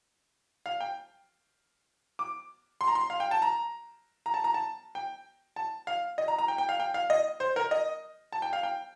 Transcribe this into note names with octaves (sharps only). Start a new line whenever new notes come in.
F5
G5
D6
C6
A#5
C6
F5
G5
A5
A#5
A#5
A5
A#5
A5
G5
A5
F5
D#5
A#5
A#5
G5
G5
F5
G5
F5
D#5
C5
A#4
D#5
A5
G5
F5
G5